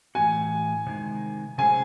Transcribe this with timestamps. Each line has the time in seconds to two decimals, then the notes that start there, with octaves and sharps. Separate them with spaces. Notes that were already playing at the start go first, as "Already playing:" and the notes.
0.15 A2 E3 C4 F#4 G#5
0.87 C3 D#3 G#3
1.58 C3 F#3 C#4 G#4 C5 G#5